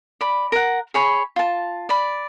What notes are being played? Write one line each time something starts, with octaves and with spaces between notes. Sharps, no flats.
D5 B5
A#4 F#5
G#4 C#5 B5
F4 A5
D5 B5